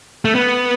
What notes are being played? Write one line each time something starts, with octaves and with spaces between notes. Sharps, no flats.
A3
B3